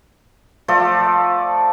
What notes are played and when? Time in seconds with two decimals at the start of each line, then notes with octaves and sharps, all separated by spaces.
0.68 F3 A3 A4 D5